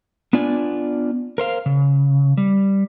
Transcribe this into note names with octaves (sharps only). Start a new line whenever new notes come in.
B3 D4 F4 D5 G#5
A#4 C5 F5
C#3
G3